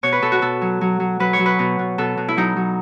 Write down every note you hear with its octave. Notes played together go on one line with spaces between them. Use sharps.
B2 C#5
B4
B2 A4
F#4
B2 A4
F#3
F#3
F#3
F#3 B4
C#5
F#3
B4
B2
B2
B2 A4
B2
E4
F#3 D#4
F#3